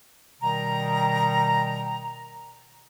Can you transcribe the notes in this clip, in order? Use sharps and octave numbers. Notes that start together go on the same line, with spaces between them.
B2 D#3 G3 G5 A#5